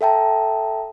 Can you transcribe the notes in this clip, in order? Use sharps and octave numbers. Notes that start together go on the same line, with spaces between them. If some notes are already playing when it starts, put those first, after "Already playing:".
A4 E5 G5 A5 A#5